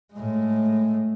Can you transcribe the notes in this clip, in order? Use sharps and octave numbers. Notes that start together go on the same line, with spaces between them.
A2 G#3